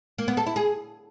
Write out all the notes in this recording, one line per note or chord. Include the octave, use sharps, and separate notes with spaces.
A#3
B3
A4
E4
G#4